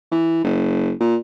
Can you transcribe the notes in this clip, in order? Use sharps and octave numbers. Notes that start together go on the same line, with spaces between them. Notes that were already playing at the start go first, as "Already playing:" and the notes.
E3
F#1
A#2